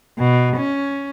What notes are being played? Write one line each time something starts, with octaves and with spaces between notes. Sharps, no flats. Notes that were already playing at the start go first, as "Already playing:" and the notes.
B2
C#4